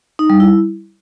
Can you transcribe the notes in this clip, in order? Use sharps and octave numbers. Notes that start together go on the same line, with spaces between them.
D#4
G3
E4